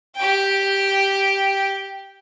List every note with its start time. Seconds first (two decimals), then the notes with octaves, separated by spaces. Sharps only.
0.16 G4 G5